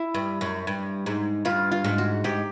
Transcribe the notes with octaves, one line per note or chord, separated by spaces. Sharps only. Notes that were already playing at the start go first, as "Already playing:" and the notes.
Already playing: E4
G2
F#2
G2
G#2
G2 F4
F4
G#2
F#4
G#2 G4